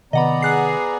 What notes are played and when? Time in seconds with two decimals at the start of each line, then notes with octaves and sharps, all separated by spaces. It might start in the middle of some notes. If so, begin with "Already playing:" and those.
0.13 C3 D#3 B3 D5 D#5 F#5 A#5 B5
0.42 G#4 F#5 F#6 C7